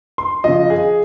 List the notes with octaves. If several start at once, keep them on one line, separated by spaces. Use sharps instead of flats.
C6
C#3 F3 D#5
G#4